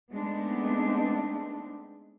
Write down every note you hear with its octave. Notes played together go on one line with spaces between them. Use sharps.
G#3 A3 B3 C4 D4 D#4